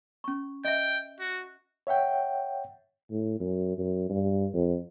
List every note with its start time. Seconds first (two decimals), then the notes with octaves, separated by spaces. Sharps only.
0.24 C#4 C#6
0.65 D#5 E5 G5
1.20 F#4
1.87 C#5 E5 F#5 G5
3.11 A2
3.40 F#2
3.78 F#2
4.10 G2
4.54 F2